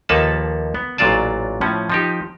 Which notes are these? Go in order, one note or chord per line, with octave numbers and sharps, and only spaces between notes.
D#2 F3 A#3 A4 B4 A5
B3
A1 A#2 F#3 F4 D5 A5
A2 F3 C#4
F3 D#4 G4